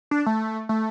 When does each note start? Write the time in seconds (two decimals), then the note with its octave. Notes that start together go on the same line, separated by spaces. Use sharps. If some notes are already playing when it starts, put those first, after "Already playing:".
0.11 D4
0.26 A3
0.69 A3